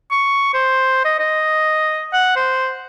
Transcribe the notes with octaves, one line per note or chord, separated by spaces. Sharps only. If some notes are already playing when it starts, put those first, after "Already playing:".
C#6
C5
D#5
D#5
F#5
C5